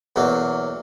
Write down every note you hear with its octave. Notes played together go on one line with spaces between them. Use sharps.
B1 E2 F#3 A#3